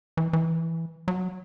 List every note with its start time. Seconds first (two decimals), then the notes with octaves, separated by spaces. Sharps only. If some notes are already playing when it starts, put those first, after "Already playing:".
0.17 E3
0.33 E3
1.08 F#3